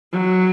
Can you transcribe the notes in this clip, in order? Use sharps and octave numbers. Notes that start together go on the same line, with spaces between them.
F#3